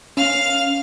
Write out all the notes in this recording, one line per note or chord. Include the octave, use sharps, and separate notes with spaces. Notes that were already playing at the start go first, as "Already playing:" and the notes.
C#4 F5 F6